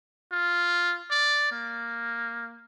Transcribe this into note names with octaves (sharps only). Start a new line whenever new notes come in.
F4
D5
A#3